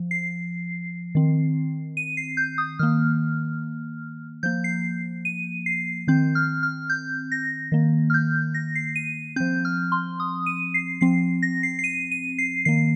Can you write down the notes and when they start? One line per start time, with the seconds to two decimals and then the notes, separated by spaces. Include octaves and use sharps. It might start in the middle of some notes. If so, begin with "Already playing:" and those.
Already playing: F3
0.11 C7
1.15 D#3 C4
1.97 D#7
2.17 C7
2.37 G6
2.58 D#6
2.79 D#3 A#3 F6
4.43 F3 A#3 G6
4.64 C7
5.25 D#7
5.66 C7
6.07 D#3 C4 G6
6.35 F6
6.63 F6
6.90 G6
7.32 A#6
7.72 D#3 A#3
8.10 F6
8.14 G6
8.54 A#6
8.75 C7
8.96 D#7
9.36 F3 C4 G6
9.65 F6
9.92 C6
10.20 D#6
10.46 D#7
10.74 C7
11.01 F3 C4 C7
11.42 A#6
11.63 C7
11.79 C7
11.84 D#7
12.12 D#7
12.38 C7
12.65 D#3 A#3 C7